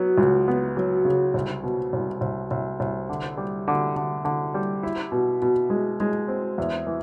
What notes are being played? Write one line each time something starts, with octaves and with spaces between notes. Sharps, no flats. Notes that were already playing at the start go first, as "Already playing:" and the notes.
Already playing: F#3 B3
C#2
B3
F#3
C#3
C2
B2
C2
C2
C2
C2
D3
G3
D3
D3
D3
G3
E4
B2
B2
G#3
G#3
C4
E2
E3